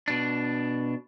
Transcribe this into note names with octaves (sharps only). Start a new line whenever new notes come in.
B2 D4